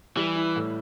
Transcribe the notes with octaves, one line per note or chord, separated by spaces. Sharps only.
E3 G3
E4
A2